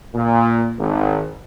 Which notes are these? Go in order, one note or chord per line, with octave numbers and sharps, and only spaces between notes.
A#2
G#1